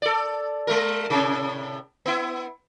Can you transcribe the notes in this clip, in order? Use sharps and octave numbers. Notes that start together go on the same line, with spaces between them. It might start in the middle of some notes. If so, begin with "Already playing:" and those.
A4 D5
G#3 A3 A#4
A2 C3 C#4
B3 E4